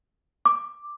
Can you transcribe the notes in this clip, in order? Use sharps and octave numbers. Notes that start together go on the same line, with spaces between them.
D6